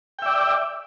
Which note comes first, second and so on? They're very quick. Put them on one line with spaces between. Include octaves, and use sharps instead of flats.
G5 E5 D5